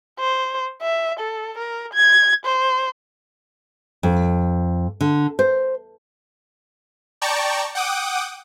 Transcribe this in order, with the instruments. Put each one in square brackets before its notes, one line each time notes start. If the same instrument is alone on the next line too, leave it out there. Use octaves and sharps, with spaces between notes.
[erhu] C5
E5
A4
A#4
G#6
C5
[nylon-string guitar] F2
D3
C5
[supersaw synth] D5 G5 A5 A#5 C#6
F#5 G5 D6 D#6